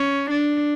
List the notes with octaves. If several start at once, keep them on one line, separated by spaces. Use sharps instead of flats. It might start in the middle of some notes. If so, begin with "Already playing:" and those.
Already playing: C#4
D4